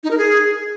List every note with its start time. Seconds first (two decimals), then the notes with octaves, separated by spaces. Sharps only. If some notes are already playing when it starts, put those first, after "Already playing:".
0.04 D#4
0.11 A#4
0.18 G#4